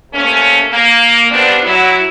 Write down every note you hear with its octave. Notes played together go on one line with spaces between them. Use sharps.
C3 A3 A#3 C#4
A#3
F3 G3 B3 C4 D4
F#3 E4